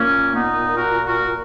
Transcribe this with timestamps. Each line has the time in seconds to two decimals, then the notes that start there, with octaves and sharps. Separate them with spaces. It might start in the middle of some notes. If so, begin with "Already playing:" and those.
Already playing: A#2 A#3 C#4
0.35 B3 D#4
0.77 F#4 A#4
1.06 F#4 A#4